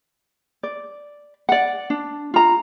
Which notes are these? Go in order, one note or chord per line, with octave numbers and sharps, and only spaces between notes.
D5
D5 F#5
D4
F4 A#5